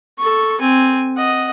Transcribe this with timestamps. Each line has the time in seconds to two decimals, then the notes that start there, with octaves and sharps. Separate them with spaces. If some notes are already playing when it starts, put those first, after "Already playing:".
0.19 A4 C#6
0.60 C4 G#5
1.17 D#5 F#5